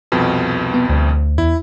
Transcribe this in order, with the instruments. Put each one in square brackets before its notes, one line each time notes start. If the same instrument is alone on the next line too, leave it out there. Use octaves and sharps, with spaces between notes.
[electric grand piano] C2 F2 B2
[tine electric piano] B3
D2
[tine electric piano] E2 [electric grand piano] E4